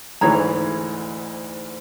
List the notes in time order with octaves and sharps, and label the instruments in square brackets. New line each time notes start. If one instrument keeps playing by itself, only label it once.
[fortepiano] D2 G#2 E3 [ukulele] G#4 C#5 A#5